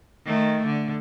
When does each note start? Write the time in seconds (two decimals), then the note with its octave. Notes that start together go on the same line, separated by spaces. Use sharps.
0.25 D#3 A3
0.66 D3